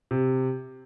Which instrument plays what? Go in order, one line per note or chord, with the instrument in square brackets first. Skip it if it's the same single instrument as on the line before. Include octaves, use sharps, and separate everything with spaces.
[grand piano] C3